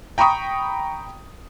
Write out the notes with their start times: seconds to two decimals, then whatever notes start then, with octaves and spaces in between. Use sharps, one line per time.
0.18 G5 A#5 B5 C#6 D#6